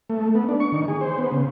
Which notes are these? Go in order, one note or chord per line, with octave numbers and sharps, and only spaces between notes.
A3
B3
D4
C#6
D#3
G#4
C5
B3
C#3